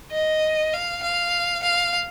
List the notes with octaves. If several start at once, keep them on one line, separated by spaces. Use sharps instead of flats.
D#5
F5
F5
F5